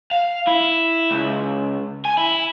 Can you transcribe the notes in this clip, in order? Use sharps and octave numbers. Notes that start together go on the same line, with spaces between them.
F5
E4
C#2
G#5
E4